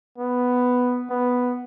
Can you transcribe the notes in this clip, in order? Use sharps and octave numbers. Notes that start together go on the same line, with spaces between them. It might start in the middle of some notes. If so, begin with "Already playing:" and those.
B3
B3